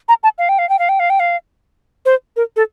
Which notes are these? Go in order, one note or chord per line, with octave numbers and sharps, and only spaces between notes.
A#5
A5
F5
G5
F5
G5
F5
G5
F5
G5
F5
C5
A#4
A4